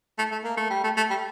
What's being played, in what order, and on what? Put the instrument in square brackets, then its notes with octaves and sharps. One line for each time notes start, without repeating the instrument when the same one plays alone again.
[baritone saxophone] A3
A3
A#3
A3
G3
A3
A3
G3